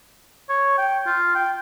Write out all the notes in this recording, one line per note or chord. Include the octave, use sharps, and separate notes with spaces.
C#5
G5
F4
G5